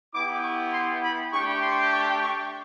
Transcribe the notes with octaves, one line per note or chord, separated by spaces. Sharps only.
B3 E4 G4 D6
C#6
C6
B5
A3 D4 G4 C#6
C6
C#6
C#6